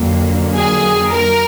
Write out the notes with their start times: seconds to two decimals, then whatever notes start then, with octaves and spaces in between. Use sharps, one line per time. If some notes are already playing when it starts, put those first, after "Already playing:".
Already playing: F2 D3 F#3 A#3
0.55 G#4
1.10 A#4